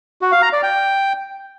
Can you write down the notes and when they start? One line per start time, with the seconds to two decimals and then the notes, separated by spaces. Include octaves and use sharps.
0.22 F#4
0.32 F5
0.42 A#5
0.53 D5
0.63 G5